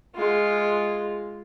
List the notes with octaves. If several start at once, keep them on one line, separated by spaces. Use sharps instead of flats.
G#3 F4